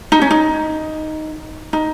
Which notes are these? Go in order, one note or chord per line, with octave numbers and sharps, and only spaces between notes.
D#4
C#4
D#4
D#4